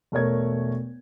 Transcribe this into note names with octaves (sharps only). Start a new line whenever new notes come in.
E1 A3 A#4 C#5 G#6